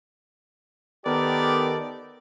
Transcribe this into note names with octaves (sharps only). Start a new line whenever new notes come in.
D#3 B3 G4 A4 A#4 D5